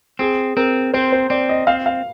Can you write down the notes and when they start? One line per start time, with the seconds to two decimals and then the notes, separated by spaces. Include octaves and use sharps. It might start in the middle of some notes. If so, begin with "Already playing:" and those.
0.19 C4 G#4
0.57 C4 A#4
0.94 C4 C5
1.12 C5
1.30 C4 D5
1.49 D#5
1.67 C4 F5
1.86 F5